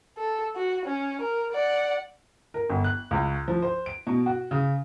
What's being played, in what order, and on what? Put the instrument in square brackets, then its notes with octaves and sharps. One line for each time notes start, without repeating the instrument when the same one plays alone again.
[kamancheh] A4
F#4
C#4
A#4
D5 F#5
[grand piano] A#4
G1
F#6
C#2
F3
C5
D7
B2
F#4
C#3